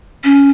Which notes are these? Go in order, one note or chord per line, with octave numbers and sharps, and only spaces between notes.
C#4